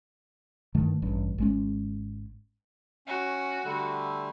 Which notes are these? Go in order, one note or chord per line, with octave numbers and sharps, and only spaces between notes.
G2 D#3 A3
A1 G2
G#1 G#3 C#4
C#4 F#4
D3 G3 A3